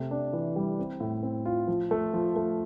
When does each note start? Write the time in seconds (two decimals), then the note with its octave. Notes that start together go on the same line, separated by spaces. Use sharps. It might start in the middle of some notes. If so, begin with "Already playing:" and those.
Already playing: C3 A3
0.11 D4
0.33 E3
0.56 G3
0.79 C4
1.00 A2
1.23 C4
1.45 F4
1.68 F3
1.91 A3
2.14 F3
2.36 A3